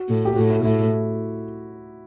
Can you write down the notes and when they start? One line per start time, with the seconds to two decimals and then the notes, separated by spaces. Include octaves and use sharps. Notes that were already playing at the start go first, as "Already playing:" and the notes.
Already playing: F#4
0.09 A2
0.25 G4
0.36 A2 F#4
0.50 E4
0.64 A2 E4